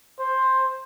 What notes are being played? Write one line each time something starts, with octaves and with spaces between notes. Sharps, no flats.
C5